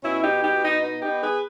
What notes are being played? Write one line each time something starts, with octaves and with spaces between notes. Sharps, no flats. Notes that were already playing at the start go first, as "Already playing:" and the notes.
B2 C#4 E4
D#4 G4
B2
D#4 G4
B2
D#4
B3 D#4
D#4 G4
B3
G#4 B4